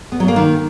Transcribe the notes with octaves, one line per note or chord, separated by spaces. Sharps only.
B3
F#3
A#3
D#3